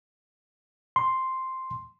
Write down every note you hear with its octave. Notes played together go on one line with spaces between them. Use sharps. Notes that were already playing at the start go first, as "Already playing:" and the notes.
C6